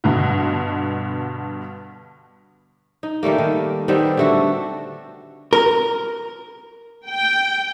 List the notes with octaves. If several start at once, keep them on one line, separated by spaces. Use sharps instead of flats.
G2 B2 D3
D#4
D#3 G3 A3 A#3
D#3
D#3 G3 B3 C4
D3 A3 F#4
A#4
G5